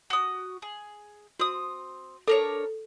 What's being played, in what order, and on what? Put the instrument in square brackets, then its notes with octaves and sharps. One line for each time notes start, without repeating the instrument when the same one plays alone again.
[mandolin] F#4 D#6
G#4
[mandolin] C4 D#6 [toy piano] F#4
[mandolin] D4 A#4 C#5 [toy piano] A4